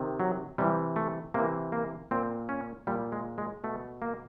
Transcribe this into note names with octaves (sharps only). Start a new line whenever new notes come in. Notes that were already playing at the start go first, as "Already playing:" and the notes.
Already playing: C3 D#3
F#3
C3 E3 G3
A3
C3 E3 A#3
A#3
A#2 C4
C#4
A#2 G3
G#3
G#3
B2 A3
A#3